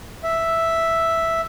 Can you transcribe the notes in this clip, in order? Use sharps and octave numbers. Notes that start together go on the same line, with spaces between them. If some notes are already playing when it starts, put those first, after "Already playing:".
E5